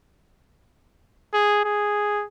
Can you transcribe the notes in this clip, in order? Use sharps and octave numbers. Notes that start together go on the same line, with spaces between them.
G#4
G#4